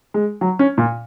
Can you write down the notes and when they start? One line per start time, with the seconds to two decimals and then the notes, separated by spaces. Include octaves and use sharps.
0.14 G#3
0.41 F#3
0.59 C#4
0.78 A#2